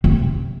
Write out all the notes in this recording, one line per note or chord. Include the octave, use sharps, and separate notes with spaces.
C3